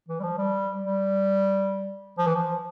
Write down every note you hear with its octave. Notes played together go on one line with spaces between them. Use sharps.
E3
G3
F3
G3
G3
F3
E3
F3